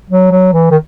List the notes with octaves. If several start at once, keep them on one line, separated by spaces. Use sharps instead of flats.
F#3
F#3
E3
D#3